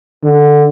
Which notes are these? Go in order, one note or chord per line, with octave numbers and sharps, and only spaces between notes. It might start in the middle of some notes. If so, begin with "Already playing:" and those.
D3